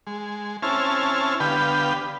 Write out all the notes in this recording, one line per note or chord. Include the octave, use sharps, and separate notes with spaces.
G#3
C4 C#4 E4 G#5 A5 F6
D3 B3 G4 B4 F5 G5